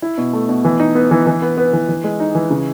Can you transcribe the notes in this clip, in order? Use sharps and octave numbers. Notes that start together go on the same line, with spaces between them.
E4
B2
A3
B2
E3
D#4
B3
E3
E3
B3
B3
E3
E3
G#3
D#4
E3
C#3